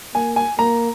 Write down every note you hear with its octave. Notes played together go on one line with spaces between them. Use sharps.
A#3 G#5
G#5
A#3 A#5